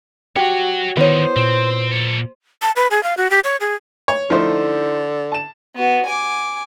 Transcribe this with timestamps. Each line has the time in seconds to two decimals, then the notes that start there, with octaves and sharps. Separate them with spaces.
0.36 F#4 G4 C#5 F#5
0.97 D3 D#3 B3 D#4 E4 C5 C#5
1.36 A#2 C4
1.91 A#3 A4
2.62 A5
2.76 B4
2.91 G#4
3.03 F5
3.17 F#4
3.31 G4
3.44 C#5
3.61 G#4
4.08 C#5
4.30 D3 F3 A3 D#4 E4 C5
5.32 A5 E7
5.76 B3 F#4
6.06 G#5 D6